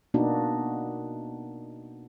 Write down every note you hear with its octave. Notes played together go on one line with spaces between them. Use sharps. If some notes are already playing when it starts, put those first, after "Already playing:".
B2 A#3 B3 D4 D#4 F#4